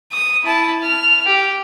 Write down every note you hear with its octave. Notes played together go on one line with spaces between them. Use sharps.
D#6
E4 A5
F6
G4